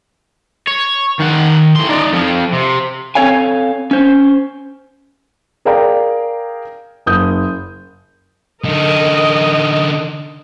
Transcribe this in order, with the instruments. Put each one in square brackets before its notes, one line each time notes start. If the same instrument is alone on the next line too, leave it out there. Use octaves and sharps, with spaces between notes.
[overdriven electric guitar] C#5
D#3 F#5
A2 C6
D#4 D5
F2 F3
C3
[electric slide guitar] C4 A4 C#5 F5 G#5
C#4 C5
[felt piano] G#4 A#4 D5 F5 G5 A#5
F#1 D#6 G6
[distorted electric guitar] D3 D#4 [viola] A#4 D#5